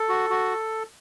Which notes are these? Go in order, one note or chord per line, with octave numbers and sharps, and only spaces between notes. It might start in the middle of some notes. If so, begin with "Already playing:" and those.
Already playing: A4
F#4
F#4